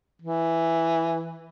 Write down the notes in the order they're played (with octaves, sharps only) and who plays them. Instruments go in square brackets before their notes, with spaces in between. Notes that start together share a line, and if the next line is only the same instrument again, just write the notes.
[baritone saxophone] E3